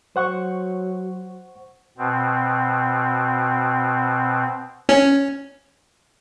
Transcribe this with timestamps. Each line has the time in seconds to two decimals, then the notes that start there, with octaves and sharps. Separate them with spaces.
0.16 F#3 C5 F#5 C#6
1.98 B2 C4
4.89 C#4